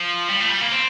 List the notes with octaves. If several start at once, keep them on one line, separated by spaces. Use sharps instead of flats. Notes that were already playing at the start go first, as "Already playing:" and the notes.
Already playing: F3
G3
A3
G3
A#3
C4